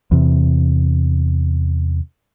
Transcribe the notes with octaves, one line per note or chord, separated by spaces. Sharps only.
E2 C3